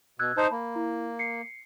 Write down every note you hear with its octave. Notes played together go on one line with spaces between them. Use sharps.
B2 E6 F#6 G#6
D#4 C5 A5
A#3 B5
E4
C7 C#7